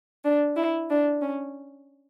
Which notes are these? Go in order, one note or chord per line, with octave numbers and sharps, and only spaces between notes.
D4
E4
D4
C#4